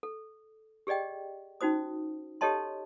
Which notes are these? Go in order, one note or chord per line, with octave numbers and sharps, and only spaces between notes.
A4
G4 G#4 D5 D#5 G5
C#4 D#4 F#4 C5 D#6
G4 A4 C#5 D#5 A5 C6